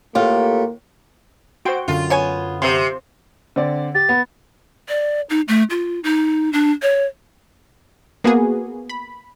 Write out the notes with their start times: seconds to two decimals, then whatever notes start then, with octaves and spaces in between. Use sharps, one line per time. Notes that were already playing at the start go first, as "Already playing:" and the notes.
0.15 A2 A#3 F4 G4 A4
1.65 F#4 C5 G5 C6 D7
1.88 F#2 D3 F4
2.10 B3 C#5 G#5
2.62 C3 C5 C6
3.56 D3 C4 D5
3.95 G4 A6
4.09 B3
4.89 D5
5.30 D#4
5.48 A3
5.70 F4
6.04 D#4
6.53 D4
6.82 C#5
8.24 A#3 B3 F#4 G#4
8.90 B5